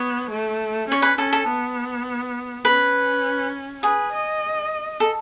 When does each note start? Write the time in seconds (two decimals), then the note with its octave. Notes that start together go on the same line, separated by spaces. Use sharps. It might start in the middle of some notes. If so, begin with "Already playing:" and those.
Already playing: B3 C#5
0.30 A3
0.88 C#4 C#5
1.02 B4
1.18 C#4 A4
1.33 A4
1.47 B3
2.65 C#4 B4
3.83 G#4 B4
4.12 D#5
5.00 A4